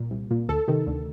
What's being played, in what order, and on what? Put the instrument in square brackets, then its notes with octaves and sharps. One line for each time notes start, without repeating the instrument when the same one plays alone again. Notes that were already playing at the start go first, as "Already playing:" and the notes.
Already playing: [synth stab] C2 A#2
C2
A#2
D2 A4
C3 D#3
D2